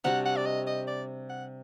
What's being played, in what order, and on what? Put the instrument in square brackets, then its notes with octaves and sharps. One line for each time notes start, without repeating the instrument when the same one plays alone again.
[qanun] C3 G3 D4 F#4 [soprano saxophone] F#5
[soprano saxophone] F#5
D5
D#5
D#5
D5
F#5